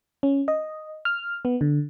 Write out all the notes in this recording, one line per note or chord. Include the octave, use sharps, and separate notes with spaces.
C#4
D#5
F6
B3
D3